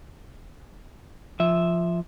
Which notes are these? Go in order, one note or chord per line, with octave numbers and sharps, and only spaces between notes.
F3 E5